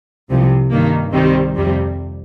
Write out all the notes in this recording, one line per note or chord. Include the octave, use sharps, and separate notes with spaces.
C2 C3 F3
G2 D#3 A#3
C2 C3 D#3 G3 C4
F2 C3 G3